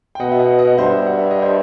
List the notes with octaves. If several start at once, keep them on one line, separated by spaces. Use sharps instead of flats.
G5
B2 D#5 F#5
E5
D#5 F#5
D#5 F#5
G2 C5 E5
F#5
E5
D#5
C5 E5